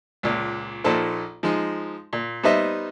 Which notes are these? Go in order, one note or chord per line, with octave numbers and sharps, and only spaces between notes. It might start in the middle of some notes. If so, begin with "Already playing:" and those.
C#2 A#2
A#1 A#2 D#4 A4 C5
F3 G#3 D#4
A#2
G3 B3 D#4 C5 D#5 E5